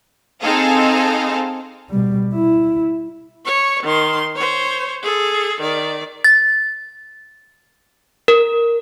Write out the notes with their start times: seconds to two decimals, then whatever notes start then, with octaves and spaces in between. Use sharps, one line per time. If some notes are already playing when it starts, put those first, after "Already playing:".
0.42 C4 D#4 G#4 A4 F5
1.90 B2 G3
2.34 E4
3.45 C#5 C#6
3.83 D#3 C6
4.36 C5 C#5
5.03 G#4 A4
5.61 D#3 D5
6.24 A6
8.28 A#4